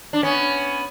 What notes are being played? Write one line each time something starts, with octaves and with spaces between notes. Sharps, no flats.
D4
B3 C#4